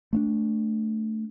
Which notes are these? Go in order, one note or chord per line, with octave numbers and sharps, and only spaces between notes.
A3 B3 D4